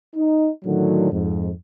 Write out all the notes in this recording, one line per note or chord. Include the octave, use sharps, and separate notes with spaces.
D#4
A2 D3 D#3 F#3
F2 G#2